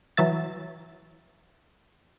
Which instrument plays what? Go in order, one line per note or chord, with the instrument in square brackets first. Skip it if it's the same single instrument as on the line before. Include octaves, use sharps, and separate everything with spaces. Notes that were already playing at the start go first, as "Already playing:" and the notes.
[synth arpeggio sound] E3 F#3 E5 A6